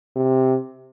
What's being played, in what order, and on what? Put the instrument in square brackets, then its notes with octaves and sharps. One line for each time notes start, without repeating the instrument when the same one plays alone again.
[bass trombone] C3